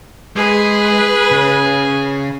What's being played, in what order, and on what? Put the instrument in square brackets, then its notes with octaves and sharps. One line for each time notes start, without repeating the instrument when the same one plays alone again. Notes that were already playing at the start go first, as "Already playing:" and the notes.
[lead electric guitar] G#3 [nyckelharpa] G#4 [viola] B4
[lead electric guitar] C#3 C#4